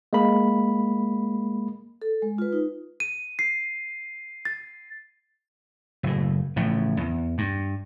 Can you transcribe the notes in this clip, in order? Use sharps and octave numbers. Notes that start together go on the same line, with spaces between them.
G#3 A#3 B5
A4
G#3
F4 B4
D#4
D#7
C7
A6
F#1 A2
A1 A2 C#3 F3
E2
G2